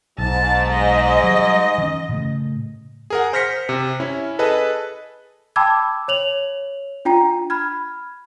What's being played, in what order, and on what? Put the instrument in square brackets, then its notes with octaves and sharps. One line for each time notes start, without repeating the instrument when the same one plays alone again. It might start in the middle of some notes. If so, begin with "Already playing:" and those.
[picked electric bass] B1 [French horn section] G#2 [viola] A5
[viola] D#5
[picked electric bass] F#3 G3
E3 C#4
A2 C#3 A3
[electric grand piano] G#4 A#4 F#5
C5 F6 A#6 B6 C#7
C3
C#4 E4
G#4 A4 B4 D#5 A5
[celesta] G5 A5 B5 D6 E6 G#6
C#5 F7 F#7
D4 F4 G5 A#5
B5 F6 G#6